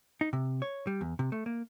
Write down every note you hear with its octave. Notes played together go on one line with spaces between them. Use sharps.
D#4
C3
C#5
G3
E2
C3
A3
A#3